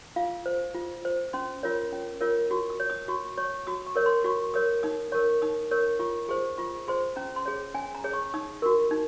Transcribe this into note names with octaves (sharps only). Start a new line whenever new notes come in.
F4 F5
C5
F4
C5
C#4 C6
F4 A#4 C#5
C#4
F4 A#4 C#5
F#4 C#6
D#6
C#5
D#6
F#4 C#6
C#5 C#6
F#4 D#6
C#6
A#4 C#5
C6
F#4 C#6
A#4 C#5 D#6
D#4 D#6
A#4 C#5 C#6
D#4 D#6
A#4 C#5 C#6
F4 C#6
G#4 C5 C#6
F4 C#6
G#4 C5 C6
C#4 A#5
C6
G#4 C#5
C#4 G#5
A#5
G#4 C#5
C#6
D#4 D#6
F#4 A#4 C#6
D#4